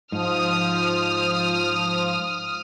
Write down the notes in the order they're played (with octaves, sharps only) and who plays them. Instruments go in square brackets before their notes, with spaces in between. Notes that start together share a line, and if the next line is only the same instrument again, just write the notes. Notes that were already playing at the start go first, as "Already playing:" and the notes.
[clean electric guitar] G#2 [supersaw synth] F3 [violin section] D#6 F6